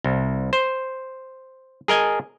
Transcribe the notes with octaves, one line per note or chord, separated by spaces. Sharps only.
C2
C5
G#4 A#4 D#5 G#5